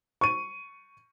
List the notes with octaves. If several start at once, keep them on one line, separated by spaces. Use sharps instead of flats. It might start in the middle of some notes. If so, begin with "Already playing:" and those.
C#6 D#7